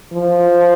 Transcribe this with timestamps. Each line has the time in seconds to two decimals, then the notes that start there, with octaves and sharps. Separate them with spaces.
0.13 F3